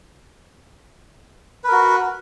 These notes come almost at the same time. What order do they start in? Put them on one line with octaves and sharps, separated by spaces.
B4 A#4 F#4